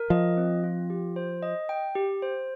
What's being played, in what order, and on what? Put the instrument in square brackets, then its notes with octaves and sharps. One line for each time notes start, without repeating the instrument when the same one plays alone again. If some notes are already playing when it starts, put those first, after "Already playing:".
Already playing: [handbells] A#4
[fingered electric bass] F3 [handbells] D#5
[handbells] C4
F4
G4
C5
D#5
G5
G4
C5